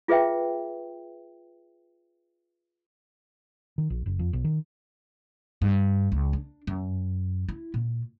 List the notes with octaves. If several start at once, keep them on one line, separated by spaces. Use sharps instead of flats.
F4 G#4 B4 E5 G5
D#3
A#1
F#1
F2
B1
D#3
G2
C#2
D4
F#2
E4
A#2